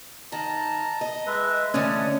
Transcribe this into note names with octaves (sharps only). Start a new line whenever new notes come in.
D#3 A5 A#5
D#5
G#3 B4 E5
D3 E3 A3 C#4 D#6